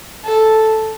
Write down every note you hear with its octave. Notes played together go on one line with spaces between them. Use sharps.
A4